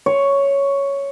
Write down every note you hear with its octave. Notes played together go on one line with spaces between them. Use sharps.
C#5